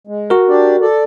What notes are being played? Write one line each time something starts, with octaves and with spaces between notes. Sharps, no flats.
G#3
F#4 A#4
D4 G4 D5
A4 D5